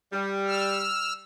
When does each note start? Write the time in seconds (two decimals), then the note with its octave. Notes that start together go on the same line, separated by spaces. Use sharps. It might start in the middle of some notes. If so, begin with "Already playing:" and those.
0.12 G3
0.46 E6 F6